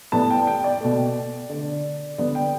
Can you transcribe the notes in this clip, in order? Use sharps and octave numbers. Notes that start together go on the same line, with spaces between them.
A2 G3 B3 A5
G5
G5
D5
B2 A3
D3 A3
D3 G3 B3 D5
G5